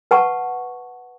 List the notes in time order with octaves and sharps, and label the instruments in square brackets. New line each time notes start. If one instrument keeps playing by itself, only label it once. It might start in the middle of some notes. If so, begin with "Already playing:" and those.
[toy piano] B4 F#5 A5 C#6